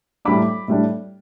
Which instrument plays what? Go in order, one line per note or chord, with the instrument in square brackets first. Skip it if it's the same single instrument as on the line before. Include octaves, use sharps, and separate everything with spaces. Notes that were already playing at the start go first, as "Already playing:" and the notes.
[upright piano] A2 G3 D4 B5 D6
A2 G3 D4